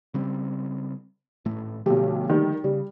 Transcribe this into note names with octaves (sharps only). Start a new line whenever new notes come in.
C#3 G3 C4
G#1 A2 A3
B1 D3 F3 A3 G4
D#3 G3
C#3 G3